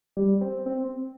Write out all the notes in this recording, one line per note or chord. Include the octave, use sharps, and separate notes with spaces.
G3
C4
C4